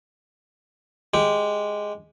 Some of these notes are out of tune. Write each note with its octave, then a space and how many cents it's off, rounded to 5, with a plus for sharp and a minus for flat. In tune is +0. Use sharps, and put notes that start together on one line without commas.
G#3 +0 G4 +0